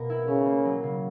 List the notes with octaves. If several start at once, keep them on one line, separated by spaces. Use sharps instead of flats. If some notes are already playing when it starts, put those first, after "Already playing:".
Already playing: B2 A#3 A#4
E4
C#3 C#4
A#3
F#3
C#3